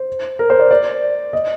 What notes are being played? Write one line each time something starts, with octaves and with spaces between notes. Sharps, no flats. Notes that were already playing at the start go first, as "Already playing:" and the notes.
Already playing: C5
A#4
C5
D5
D5
D#5